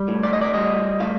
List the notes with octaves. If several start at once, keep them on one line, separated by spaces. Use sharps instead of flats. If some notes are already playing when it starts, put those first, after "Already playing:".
Already playing: G3
A2
D5
D#5
D5
G3 D#5
A2 F5